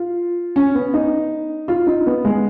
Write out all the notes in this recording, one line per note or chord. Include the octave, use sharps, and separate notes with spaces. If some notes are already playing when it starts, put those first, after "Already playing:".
Already playing: F4
C#4
B3
D#4
F4
D#4
B3
G#3